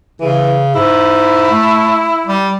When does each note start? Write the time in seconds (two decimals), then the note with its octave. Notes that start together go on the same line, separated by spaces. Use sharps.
0.21 C#3 E3
0.75 G#2 E4
1.51 A3
2.27 G3